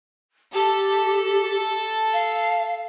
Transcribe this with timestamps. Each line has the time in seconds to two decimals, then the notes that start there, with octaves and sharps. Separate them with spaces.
0.54 G4 A4
2.13 F5